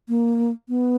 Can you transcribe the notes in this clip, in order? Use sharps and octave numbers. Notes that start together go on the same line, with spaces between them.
A#3
B3